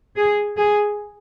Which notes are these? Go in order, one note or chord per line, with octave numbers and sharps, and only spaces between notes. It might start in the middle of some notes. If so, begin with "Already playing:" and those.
G#4
G#4